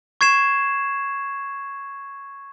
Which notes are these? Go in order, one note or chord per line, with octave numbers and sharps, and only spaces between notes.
C#6 G#6 C7 E7